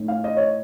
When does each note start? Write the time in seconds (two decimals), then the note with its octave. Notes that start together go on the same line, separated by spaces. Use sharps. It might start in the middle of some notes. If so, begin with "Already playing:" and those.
Already playing: A2 A3 D#4
0.08 F5
0.24 D#5
0.36 C#5